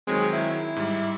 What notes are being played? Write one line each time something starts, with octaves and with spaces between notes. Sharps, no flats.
D#3 F#3 G#3 C4
E4
G#2 G3